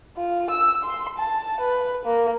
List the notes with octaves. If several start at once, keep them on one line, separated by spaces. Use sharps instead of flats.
F4
E6
C6
A5
B4
A#3